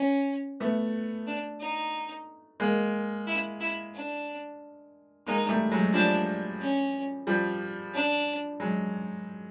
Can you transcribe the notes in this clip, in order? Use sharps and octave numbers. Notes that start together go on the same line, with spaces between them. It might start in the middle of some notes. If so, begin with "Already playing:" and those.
Already playing: C#4
A3 B3
D4
D#4
G#3 A#3
E4
E4
D4
G#3 A#3 D#4
G3 A3
F#3 G#3
F3 G3 D4
C#4
F3 G3
D4
F#3 G#3